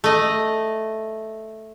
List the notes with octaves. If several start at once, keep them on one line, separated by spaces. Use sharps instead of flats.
A3 D#5